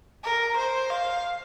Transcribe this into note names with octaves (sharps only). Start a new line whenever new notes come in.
A#4
C5
F5